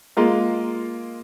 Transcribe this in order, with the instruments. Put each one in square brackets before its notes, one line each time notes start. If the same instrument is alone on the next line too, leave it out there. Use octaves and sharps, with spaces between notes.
[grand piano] G#3 A#3 F4 A#4